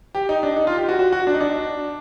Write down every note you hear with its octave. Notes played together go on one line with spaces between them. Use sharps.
G4
D#4
D4
D#4
F4
G4
F#4
F#4
F#4
D4
D#4
D4